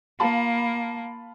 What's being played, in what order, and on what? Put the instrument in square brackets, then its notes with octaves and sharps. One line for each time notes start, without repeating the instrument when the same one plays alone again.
[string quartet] A#3 [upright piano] F4 A5 B5